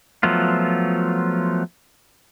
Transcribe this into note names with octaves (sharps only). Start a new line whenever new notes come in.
F3 F#3 A3 B3 F4